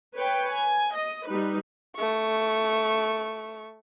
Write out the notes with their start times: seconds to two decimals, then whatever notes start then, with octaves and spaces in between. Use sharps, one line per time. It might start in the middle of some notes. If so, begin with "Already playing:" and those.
0.16 B4 C#5 G5
0.53 G#5
0.96 D#5
1.28 G3 D#4 B4
1.96 A3 C#6